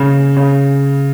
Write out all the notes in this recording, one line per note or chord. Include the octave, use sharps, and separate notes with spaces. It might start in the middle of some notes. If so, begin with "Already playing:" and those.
Already playing: C#3
C#3